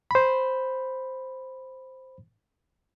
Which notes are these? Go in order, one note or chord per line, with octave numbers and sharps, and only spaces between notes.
C5 B5